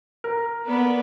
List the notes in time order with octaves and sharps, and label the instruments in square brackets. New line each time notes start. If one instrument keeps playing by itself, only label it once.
[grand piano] A#4
[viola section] B3 B4 D5